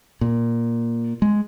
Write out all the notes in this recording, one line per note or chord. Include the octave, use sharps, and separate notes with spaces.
A#2
G#3